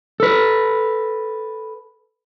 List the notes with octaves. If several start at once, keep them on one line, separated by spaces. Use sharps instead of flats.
A4 B4